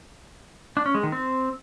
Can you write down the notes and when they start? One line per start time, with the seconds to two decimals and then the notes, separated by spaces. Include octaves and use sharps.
0.77 D4
0.86 C#4
0.95 G#3
1.03 D#3
1.12 C4